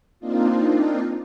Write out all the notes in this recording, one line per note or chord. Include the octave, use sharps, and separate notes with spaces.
A#3 C4 D4 D#4 F4